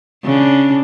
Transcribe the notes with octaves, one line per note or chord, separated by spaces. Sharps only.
C#3 D4